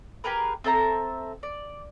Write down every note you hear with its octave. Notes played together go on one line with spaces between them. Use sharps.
G4 G#4 A#4 B4
C4 A4 E5 A#5
D5